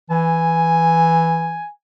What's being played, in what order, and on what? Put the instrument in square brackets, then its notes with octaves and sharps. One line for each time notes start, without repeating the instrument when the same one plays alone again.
[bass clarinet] E3 [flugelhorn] G#5